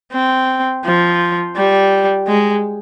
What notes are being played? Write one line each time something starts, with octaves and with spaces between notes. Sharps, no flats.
C4
F3
G3
G#3